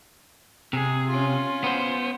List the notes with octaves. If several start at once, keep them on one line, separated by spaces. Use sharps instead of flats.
C3 G#4
C#4 F4
B3 C5